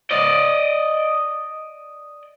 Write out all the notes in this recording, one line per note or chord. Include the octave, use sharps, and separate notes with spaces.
D5 D#5